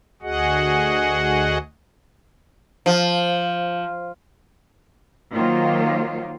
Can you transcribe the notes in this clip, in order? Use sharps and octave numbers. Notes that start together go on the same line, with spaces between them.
D2 F#4 G#4 D#5 F#5
F3
D#3 F#3 A#3 F4 C5